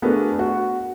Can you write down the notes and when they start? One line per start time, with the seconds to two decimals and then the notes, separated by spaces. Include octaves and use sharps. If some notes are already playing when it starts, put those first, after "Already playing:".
0.02 A3 B3 D4 F#4 G#4 A#4
0.39 F#4